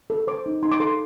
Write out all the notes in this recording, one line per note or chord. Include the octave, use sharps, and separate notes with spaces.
A4
C5 D6
D#4
D#4 C6
D6
A4 C6